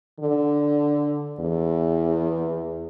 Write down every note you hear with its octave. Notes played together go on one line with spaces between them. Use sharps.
D3
E2